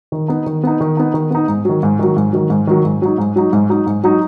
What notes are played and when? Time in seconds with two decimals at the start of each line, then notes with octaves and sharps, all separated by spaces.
0.12 D#3
0.28 B3 D#4
0.46 D#3
0.63 B3 D#4
0.80 D#3
0.97 B3 D#4
1.14 D#3
1.30 B3 D#4
1.48 G#2
1.65 D#3 F#3
1.83 G#2
1.99 D#3 F#3
2.16 G#2
2.33 D#3 F#3
2.50 G#2
2.67 D#3 F#3
2.85 G#2
3.02 F#3 D#4
3.18 G#2
3.36 F#3 D#4
3.53 G#2
3.69 F#3 D#4
3.86 G#2
4.04 F#3 D#4